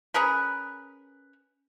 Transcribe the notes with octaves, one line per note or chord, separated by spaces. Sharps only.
C#4 G#4 A#4 B4